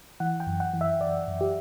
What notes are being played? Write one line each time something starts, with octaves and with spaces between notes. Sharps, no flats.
E3 F#5
G5
F#2
F#5
E3
E5
F#2 D5
F#2
G4